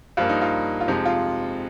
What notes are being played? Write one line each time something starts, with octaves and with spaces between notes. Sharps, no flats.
G2 F3 A#3 F4
D#4
F4
F4
F2 C3 F3 G#3 D#4
F4